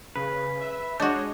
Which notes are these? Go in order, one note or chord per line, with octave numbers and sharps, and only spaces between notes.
C#3 B4
E5
G#3 D4 F#4 C#5 D#5 G6